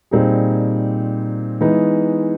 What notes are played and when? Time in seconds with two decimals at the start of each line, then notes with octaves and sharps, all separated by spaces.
0.11 A#2 G3 C4 D#4 G#4
1.61 E3 G#3 B3 D#4